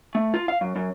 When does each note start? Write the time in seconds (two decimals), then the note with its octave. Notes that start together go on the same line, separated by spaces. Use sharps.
0.15 A3
0.34 F4
0.48 F5
0.61 F#2
0.76 F#2